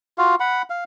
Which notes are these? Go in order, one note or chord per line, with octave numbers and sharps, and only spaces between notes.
F4 F#4 F5
F#5 B5
F5